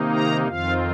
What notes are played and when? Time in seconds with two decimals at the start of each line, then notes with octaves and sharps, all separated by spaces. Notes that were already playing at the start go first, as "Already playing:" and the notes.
Already playing: C3 D#3 A#3 D#4
0.12 A#5
0.48 F2 D#3 C4 F4 F5